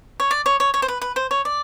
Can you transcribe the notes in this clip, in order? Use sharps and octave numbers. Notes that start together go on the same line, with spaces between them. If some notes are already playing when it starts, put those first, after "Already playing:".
C#5
D5
C#5
C#5
C#5
C5
B4
B4
C5
C#5
D5